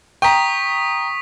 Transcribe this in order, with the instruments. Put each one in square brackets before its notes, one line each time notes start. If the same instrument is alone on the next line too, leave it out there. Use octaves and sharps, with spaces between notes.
[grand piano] G5 A#5 [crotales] C#6 D#6 B6